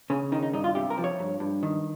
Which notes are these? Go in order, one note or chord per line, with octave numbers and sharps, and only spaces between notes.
C#3 C#4
D#3 D#4
D#4
G2 D#4
F4
C3 G4
A#4
F3
C#5
G2
G2
D#3